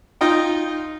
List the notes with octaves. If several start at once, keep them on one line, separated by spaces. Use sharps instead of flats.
D#4 F4 D#5 G5